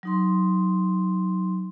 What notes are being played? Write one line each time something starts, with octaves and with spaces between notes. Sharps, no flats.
F#3 D#4 C6